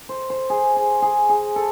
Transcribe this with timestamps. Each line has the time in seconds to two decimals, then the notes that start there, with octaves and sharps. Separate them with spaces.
0.09 C5
0.30 C5
0.50 G#4
0.76 G#4
1.02 G#4
1.29 G#4
1.56 A4